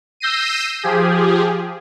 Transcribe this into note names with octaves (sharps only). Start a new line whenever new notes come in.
E6 G6 A#6 C7 D#7
F3 G4 G#4